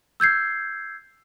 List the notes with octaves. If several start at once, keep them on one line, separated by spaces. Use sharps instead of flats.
E6 G6 G#6 C7